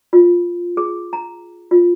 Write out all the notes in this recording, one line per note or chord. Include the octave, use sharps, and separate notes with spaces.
F4
G#4
A#5
F4